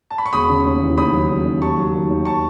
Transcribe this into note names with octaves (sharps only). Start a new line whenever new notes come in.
A5
B5
C#6
E1 B5 D#6
C#3
D#2
E3
D#2 B5 D#6
F#3
C#3
D#2
D#2 A5 C#6
F#3
D#3
D#2
A5 C#6